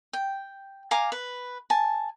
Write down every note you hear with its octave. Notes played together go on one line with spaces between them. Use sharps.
G5
F5 G#5 A#5 D6
B4
G#5 A5